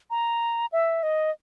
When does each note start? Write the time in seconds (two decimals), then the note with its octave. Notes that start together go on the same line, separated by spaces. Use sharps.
0.10 A#5
0.72 E5
1.03 D#5